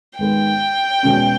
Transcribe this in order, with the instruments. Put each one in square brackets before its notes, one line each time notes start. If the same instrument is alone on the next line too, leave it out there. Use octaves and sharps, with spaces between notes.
[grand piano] G#2 D#3 G#3 B3 [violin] G5
[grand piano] E2 B2 G#3 C#4